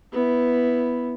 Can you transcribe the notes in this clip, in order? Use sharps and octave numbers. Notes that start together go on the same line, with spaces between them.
B3 E4